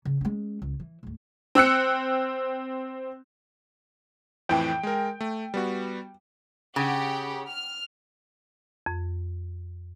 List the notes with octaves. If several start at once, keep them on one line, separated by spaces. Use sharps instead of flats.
C#3
G#3 C#4
C#2
E3
D2 G#2
C4 E6 F#6 C#7
F2 A2 E3 G5
G#3 A#4
A3
G3 B3 F#4
C#3 G4 F#5
F6
F2